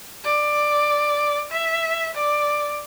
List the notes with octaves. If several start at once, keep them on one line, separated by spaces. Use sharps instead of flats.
D5
E5
D5